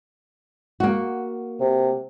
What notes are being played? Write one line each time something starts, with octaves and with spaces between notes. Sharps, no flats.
A#3 F#4
C3